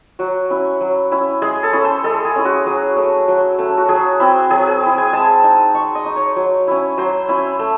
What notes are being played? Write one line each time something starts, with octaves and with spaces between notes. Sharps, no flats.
F#3 F#4
C#4 E4
F#3
C#4 E4
G#3 G#4
A4
C#4 E4
C5
G#3 A4
G#4
C#4 E4
F#4
F#3 G#4
A3 C#4
F#3
A3 C#4
F#4
F#3 G#4
C4 E4
F#3 G#4
G#4
C4 E4
G#5
G#3 A5
D#4
G#3 C#6
D#5
D#4
C#5
F#3
C#4 E4
F#3 C5
C#4 E4
A3